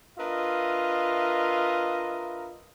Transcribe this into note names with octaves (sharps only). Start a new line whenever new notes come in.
D4 F4 A#4 B4 D#5 E5